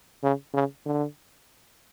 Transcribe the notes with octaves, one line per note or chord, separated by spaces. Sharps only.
C#3
C#3
D3